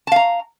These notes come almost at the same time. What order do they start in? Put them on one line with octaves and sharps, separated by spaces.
A5 F5 A#5